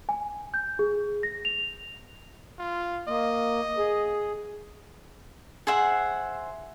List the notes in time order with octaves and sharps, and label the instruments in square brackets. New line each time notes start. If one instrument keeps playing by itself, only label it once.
[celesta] G#5
G6
G#4
A#6
F7
[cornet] F4
[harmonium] A#3 [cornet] D#5
[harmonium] G#4
[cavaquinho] G#4 C5 E5 F#5